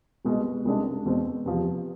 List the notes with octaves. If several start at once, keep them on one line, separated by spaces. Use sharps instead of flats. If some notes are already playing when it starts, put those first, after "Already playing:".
C2 B2 G#3
C2 C3 G#3 D4
E2 B2 G#3 C4
E2 C3 F3